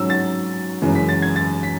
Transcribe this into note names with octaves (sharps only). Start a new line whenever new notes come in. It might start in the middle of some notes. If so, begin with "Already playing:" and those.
Already playing: G#2 F#3 C#4 E6
A6
F#1 F#2 E3 G#3
B6
A6
G#6
A6
B6